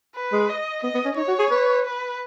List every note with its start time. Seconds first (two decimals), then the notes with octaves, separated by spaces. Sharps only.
0.15 B4
0.32 G#3
0.49 D#5
0.83 B3 D#5
0.94 B3
1.05 C#4
1.17 D#4 C#5
1.28 F#4
1.39 G#4
1.51 B4
1.85 B4